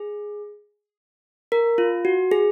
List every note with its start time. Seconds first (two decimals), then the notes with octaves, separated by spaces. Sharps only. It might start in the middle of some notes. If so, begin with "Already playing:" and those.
Already playing: G#4
1.52 A#4
1.78 F4
2.05 F#4
2.31 G#4